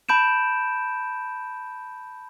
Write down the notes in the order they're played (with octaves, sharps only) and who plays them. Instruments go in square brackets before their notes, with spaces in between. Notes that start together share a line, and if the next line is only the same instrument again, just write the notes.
[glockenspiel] A5 B5 G6 D7 E7